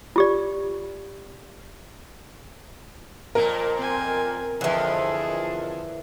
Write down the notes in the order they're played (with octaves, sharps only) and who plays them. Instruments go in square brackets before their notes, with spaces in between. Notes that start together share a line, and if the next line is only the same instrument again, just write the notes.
[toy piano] F4 G4 D5
[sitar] F2 A#2 A#3 [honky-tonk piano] A#4
[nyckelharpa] C4 G#5
[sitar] F2 F3 [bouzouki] D3 E3 [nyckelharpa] G#4